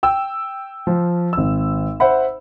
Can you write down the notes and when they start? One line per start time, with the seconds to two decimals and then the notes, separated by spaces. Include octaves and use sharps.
0.03 G5 E6
0.87 F3
1.33 G#1 E6
2.00 C5 E5 F#5 B5